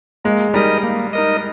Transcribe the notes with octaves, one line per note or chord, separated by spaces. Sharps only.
G#3 A#3
G3 D#4 A#4 D#5
A#3
D#4 A#4 D#5